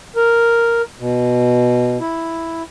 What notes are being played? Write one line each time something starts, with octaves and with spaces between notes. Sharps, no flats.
A#4
B2
E4